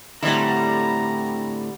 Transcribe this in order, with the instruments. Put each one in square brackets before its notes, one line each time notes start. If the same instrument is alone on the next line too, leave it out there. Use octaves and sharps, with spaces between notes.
[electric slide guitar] A2 C4 E4 [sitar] D3 G3 [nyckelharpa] A#5